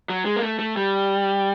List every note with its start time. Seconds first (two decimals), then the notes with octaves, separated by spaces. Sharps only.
0.10 F#3
0.25 G#3
0.36 A#3
0.42 A3
0.59 A3
0.77 G3